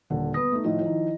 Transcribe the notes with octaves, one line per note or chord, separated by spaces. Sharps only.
D#1 D3 F#5
B3 B4 D#6 A#6
A3 D#4
A2 D#3 F3 E4 D#5
D#3 F3